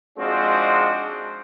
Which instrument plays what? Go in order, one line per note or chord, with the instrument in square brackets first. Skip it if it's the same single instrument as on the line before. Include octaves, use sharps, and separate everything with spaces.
[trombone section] F3 G#3 C4 D4 D#4 F#4